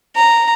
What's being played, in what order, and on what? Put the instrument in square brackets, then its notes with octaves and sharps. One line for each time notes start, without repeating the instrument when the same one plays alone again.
[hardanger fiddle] A#5